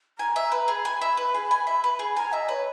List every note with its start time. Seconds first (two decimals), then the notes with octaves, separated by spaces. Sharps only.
0.19 G#5 A#5
0.36 E5
0.52 B4
0.68 G#4
0.85 G#5 B5
1.01 E5
1.17 B4
1.34 G#4
1.51 G#5
1.67 E5
1.84 B4
1.99 G#4
2.16 G#5 A#5
2.32 D#5 E5
2.49 B4 C#5